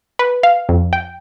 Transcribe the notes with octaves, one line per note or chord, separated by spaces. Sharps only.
B4
F5
F2
G5